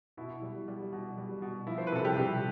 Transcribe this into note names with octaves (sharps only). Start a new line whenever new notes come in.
B2 E4
G3
G3
B2
G3
B2
F3 E4
C5
B4
C3 A4
G3 G4
C3